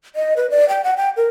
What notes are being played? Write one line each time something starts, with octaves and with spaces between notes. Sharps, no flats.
D#5
B4
D5
G5
F#5
G5
A#4